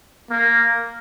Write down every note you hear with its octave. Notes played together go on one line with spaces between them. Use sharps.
A#3